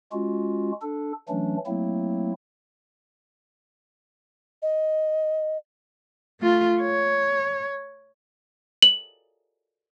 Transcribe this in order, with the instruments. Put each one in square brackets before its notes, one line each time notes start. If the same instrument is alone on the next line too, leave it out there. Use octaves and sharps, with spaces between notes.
[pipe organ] G#3 C#4 F4 F#4
D4 A4
E3 F#3 A3 C#4 D4
F#3 A3 A#3 C4 E4
[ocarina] D#5
[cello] A3 F4
C#5
[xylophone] F#7